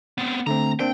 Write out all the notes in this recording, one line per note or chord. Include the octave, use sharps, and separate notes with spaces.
B3 C4
D3 A3 C4 A#5
A#3 C4 D4 G5